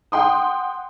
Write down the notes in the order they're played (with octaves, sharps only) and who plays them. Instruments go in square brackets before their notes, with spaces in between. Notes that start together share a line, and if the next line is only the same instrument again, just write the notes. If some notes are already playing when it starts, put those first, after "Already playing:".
[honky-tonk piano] F#5 G5 C6 D#6